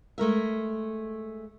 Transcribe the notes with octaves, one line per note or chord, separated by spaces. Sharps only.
G#3 A3 A#4 E5